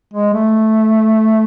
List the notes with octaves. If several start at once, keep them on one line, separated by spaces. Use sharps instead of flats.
G#3
A3